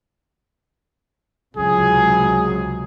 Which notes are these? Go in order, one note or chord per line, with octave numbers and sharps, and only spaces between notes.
C#2 C3 F#3 G#4